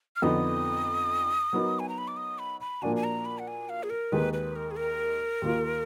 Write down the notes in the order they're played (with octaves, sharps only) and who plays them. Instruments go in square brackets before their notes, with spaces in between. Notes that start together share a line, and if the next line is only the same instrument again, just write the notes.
[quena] F6
[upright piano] F2 D3 F3 B3 D#4 [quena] D#6
[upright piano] F#3 B3 D#4 A#4
[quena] G#5
A#5
B5
D6
D#6
B5
B5
[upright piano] A#2 F3 A#3 D4 F#4 [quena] G#5
[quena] G#5
A#5
B5
F#5
G#5
F5
G#4
A#4
[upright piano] D#2 D#3 G#3 D#4 [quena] B4
[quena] B4
A#4
G#4
A#4
[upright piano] D#2 D#3 A#3 F4